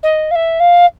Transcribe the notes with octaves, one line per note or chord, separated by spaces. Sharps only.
D#5
F5
E5
F5